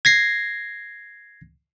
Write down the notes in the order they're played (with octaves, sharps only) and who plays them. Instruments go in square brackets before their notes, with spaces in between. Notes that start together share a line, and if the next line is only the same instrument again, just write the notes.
[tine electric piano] G#6 A#6 C7